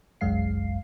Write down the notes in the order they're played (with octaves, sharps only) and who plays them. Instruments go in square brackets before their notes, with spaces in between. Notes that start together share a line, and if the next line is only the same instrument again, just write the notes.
[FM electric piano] G1 C2 F#2 G#3 F5 C7